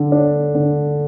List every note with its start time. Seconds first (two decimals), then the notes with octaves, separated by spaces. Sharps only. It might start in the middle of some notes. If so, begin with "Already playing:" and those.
Already playing: D3
0.12 D4
0.55 D3